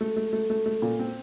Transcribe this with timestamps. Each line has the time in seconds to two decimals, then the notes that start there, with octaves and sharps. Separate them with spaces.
0.01 A3
0.16 A3
0.33 A3
0.50 A3
0.66 A3
0.82 A#2
0.99 C4